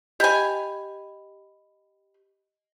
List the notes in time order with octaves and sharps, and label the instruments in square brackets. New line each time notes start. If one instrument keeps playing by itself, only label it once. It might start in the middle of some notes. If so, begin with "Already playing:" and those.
[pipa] G4 G#5 [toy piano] D#5 B5